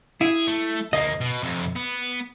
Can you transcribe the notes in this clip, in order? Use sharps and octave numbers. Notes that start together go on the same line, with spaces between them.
E4 G#4
A3
D2 A#3 D#5
B2
F2 C3
B3